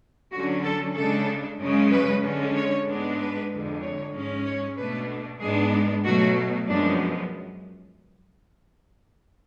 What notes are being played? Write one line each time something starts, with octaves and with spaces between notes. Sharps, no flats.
D3 F#3 C#4 F#4
A4
C#3 G#3 D4 A4
F#2 C#3 G#3 C#4
B4
D3 G#3 C#4
C#5
G#2 G#3 B3 D4
B4
F2 D3 G#3
C#5
G#2 G#3 C#4
C#5
B2 A3 D4 B4
G#2 G#3 B3 D4 G#4
B2 F#3 A3 F#4
F#2 F3 G#3 B3 D4